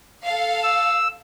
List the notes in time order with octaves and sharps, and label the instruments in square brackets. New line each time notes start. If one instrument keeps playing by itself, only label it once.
[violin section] A4 F5
[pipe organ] E6